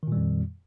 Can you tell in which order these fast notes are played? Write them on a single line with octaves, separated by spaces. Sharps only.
D#3 A#2 G3 F2